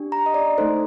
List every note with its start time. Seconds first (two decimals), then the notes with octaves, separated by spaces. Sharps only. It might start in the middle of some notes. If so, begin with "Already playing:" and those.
Already playing: D4 G4
0.12 A#5
0.26 D#5
0.34 D5
0.58 A3 D#4 A4 C5